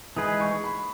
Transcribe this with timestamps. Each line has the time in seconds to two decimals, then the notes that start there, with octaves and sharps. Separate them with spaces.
0.17 E3 G#3 D#4 G#4 B4 D#6
0.40 C#6
0.64 B5